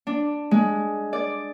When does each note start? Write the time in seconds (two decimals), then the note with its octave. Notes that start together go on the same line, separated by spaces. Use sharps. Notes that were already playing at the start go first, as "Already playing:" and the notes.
0.07 D4
0.51 G#3
1.13 D5